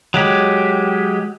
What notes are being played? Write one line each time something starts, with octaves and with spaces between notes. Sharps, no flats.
F#3 G#3 G4